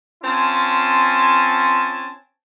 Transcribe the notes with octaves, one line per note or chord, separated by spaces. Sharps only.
C4 C#4 F4 G#5 A5